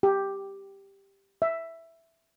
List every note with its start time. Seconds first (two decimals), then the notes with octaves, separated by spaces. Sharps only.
0.03 G4
1.42 E5